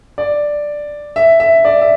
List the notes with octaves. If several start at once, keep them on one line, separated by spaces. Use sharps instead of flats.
D5
E5
E5
D5
E5